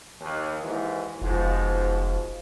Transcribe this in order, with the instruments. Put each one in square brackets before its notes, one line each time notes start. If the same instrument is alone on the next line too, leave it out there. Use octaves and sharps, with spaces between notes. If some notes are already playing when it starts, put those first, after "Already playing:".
[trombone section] D#2
D#2 G#2 E3
[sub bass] F1 [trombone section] G#2 B2 F3